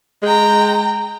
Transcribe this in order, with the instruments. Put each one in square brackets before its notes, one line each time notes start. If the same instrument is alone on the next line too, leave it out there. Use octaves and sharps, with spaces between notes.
[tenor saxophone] G#3 [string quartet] G5 A#5